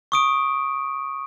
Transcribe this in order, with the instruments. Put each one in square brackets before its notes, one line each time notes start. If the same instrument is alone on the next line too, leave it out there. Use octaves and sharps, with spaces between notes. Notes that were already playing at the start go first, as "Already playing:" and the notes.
[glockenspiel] C#6 D#6 D7